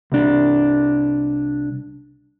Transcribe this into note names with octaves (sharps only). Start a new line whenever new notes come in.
C2 D4